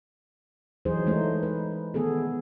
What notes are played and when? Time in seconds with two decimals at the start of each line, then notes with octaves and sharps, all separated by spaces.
0.85 E3 F#3 D#4 G#4 C5
1.06 E3 G#3 A3 D#4 C5
1.43 B4
1.94 D#3 A3 B3 G#4 A4